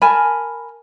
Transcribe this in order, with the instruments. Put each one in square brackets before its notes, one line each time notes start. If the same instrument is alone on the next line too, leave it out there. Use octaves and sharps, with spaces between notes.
[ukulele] A#4 G#5 A5 B5